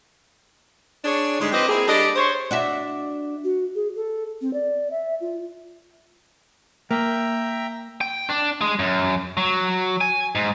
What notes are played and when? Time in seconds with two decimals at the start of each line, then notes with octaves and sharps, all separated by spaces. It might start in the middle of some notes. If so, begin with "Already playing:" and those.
1.05 D4 G#4 C#5
1.40 G#2 D3 G3 G#3
1.52 F3 C4 G4 B4 C5 D#5
1.69 A#3 C4 E4 G#4
1.88 G3 D4 G4 A4 D5 D#5
2.16 C5 C#5
2.51 D4 F#4 E5
3.44 F#4
3.75 G#4
3.96 A4
4.41 C4
4.53 D5
4.91 E5
5.21 F4
6.91 A#3 E5 G5 A#5
8.01 G5
8.29 D4
8.61 G#3
8.79 F#2
9.37 F#3
10.01 G#5
10.35 G#2